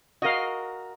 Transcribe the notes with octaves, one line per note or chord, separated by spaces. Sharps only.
F#4 A#4 D#5 F5